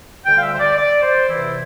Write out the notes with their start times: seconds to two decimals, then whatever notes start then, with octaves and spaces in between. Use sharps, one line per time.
0.25 D2 D3 G3 G5
0.35 F5
0.42 E5
0.52 C5
0.59 D5
0.76 D5
1.02 C5
1.28 E2 C3 E3 E4